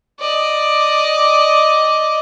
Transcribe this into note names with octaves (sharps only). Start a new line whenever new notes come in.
D5 D#5